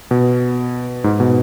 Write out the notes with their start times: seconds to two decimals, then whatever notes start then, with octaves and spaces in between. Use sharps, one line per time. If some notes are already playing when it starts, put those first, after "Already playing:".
0.11 B2
1.04 G#2
1.20 B2